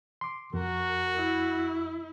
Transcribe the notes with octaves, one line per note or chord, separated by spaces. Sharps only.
C6 D6
F2 F#4 A#4
E4